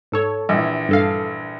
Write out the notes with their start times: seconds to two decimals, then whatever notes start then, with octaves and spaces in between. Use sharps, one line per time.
0.12 G#2 A4 C#5
0.49 A#1 E3
0.89 G2 A4 F5